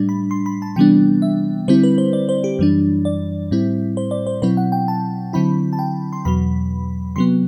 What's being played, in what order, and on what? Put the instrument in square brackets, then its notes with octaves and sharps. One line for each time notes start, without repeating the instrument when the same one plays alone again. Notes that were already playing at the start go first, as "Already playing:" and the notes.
Already playing: [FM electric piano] A2 G3 D4
B5
C6
B5
A5
C3 E3 G3 B3 D4 G5
E5
D3 G3 C4 E4 C5
B4
C5
D5
C5
G4
F#2 E3 G3 D4
D5
A2 G3 C4 E4
C5
D5
C5
B2 F#3 C4 E4 B4
F#5
G5
A5
D3 F#3 C4 E4 B5
A5
G5
C6
E2 B2 F#3 B5
C3 F#3 B3 C6